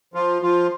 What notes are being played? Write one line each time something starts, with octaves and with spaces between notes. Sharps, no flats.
F3 F4
F3 F4